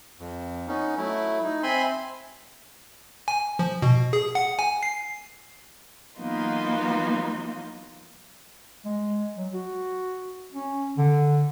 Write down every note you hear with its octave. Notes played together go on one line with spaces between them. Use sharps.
F2
B3 C#4 D#4
F#3 A3 E4
D#4
C4 E5 G#5 B5 C6
G#5
F3
B2
G#4
F#5
G#5
C7
E3 F#3 A#3 B3 D#4 F4
G#3
F#3
F#4
C#4
D3